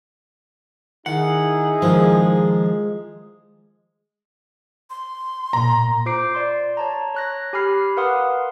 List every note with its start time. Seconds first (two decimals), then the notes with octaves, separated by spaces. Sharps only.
1.06 D#3 D#4 E4 G#4 F#5 C6
1.82 D#3 F3 G#3 A#4
4.90 C6
5.53 A#2 A#5
6.06 F4 C5 D6 C7 D7
6.35 D5 C6
6.77 C#5 A5 A#5
7.15 C#5 F#6 A#6
7.53 G4 G#5 B5 F6 C7
7.97 A#4 B4 F5 F#5 C6 D#6